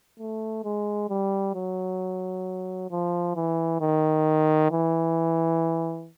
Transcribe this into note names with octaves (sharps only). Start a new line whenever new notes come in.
A3
G#3
G3
F#3
F3
E3
D#3
E3